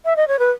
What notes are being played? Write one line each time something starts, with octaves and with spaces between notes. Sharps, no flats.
E5
D#5
C#5
B4